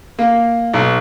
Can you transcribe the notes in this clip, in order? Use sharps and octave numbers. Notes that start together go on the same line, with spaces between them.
A#3
B1